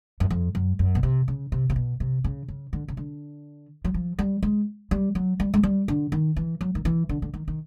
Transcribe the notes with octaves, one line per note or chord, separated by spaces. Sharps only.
F#2
F2
F#2
F#2
B2
C3
C#3
C3
C3
B2
C3
C#3
C#3
D3
C#3
D3
F#3
F3
G3
G#3
G3
F#3
G3
G#3
G3
D3
D#3
E3
F#3
D#3
E3
D3
D3
D#3
D#3